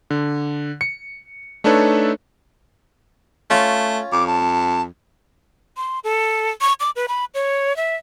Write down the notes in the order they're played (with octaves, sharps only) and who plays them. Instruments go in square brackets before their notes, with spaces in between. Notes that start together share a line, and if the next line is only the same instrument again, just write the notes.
[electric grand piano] D3
C#7
A3 D4 D#4 A4 B4 C#5
[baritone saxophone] A3 [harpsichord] C#4 F4 A#5
[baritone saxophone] F2 [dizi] D6
[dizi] A5
[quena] C6
A4
C#6
D6
B4
B5
C#5
E5